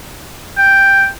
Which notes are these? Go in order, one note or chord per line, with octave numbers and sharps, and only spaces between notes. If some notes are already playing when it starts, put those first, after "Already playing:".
G5